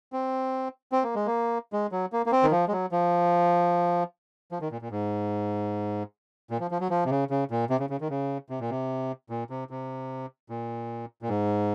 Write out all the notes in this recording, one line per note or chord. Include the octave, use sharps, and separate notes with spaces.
C4
C4
A#3
G#3
A#3
G#3
F#3
A#3
A#3
C4
D#3
F3
G#3
F#3
F3
F3
D#3
A#2
A#2
G#2
A#2
F3
F3
F#3
F3
C3
C#3
C#3
A#2
C3
C#3
C#3
D#3
C#3
C3
A#2
C3
A#2
C3
C3
A#2
A#2
G#2